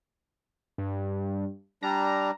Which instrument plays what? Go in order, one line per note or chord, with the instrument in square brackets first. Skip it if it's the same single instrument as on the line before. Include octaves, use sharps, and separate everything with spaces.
[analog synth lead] G2
[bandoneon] G3 D4 [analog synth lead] A#5